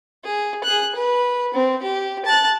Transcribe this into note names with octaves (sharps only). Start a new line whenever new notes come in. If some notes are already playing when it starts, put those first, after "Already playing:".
G#4
G#4 F#6
B4
C4
G4
A5 F#6